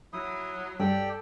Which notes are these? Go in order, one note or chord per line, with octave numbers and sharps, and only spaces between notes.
F#3 E4 D#6
G2 G4 A4 D5 G5